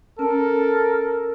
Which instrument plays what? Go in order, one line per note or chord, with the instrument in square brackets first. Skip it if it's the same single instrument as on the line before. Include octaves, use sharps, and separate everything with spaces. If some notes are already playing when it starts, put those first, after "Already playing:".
[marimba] C#4 A5 [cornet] A4 [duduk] A#4